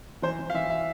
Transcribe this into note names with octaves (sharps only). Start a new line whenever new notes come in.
E3 C5
E3
F5
E3 E5
E5